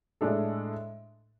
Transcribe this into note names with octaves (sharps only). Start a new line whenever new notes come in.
A2 G#3 D4 A4